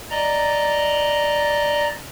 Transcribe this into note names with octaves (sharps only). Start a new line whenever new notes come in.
D5 D#5 A#5